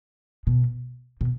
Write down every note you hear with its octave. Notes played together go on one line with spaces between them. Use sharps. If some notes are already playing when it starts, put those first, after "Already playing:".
B2
B2